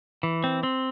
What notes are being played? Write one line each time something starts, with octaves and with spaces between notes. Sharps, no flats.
E3
C4
C4